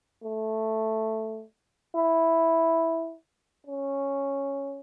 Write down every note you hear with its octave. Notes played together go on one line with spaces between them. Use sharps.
A3
E4
C#4